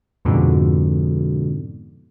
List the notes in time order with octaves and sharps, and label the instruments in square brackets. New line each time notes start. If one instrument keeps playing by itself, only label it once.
[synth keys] F2 G#2 B2 D3